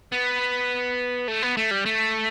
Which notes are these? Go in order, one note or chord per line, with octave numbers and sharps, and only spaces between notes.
B3
A3
B3
A3
G3
A3